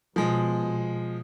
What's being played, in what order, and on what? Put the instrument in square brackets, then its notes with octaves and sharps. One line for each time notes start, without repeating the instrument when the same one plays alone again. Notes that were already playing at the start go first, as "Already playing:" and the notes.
[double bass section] B2 [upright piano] F3 G#3